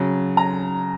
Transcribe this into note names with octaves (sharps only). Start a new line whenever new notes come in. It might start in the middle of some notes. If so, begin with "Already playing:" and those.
Already playing: C#3 F#3
A#5